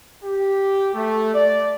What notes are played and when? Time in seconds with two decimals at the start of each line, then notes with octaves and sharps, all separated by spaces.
0.24 G4
0.94 A3
1.34 D5